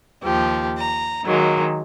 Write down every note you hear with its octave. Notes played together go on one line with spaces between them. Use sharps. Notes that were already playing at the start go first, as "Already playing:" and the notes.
D#2 F3 G4
A#5
D#3 F#3 G#3 A#3